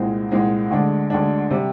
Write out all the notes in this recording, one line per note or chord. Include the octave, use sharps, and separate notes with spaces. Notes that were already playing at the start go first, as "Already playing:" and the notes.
Already playing: C2 A#2 G#3 C4
C2 A#2 G#3 C4
D2 D3 G#3 D4
D2 D3 G#3 D4
C3 G3